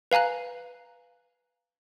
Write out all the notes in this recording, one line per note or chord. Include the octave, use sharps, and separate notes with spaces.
B4 F5 G#5 A#5 F#6